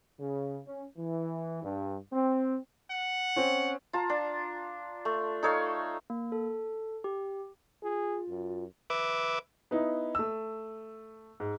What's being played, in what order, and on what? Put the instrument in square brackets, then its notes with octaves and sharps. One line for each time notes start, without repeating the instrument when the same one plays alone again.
[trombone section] C#3
C#4
E3
G2
C4
[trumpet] F#5
[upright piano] C4 C#4
[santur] F4 A5 A#5
D4
A3
D#4 A4 C#5 F5
[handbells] A#3
A4
G4
[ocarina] F4 [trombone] G#4
[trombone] F#2
[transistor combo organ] B4 E5 D6
[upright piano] B3 D#4 E4
A3 E6
G#2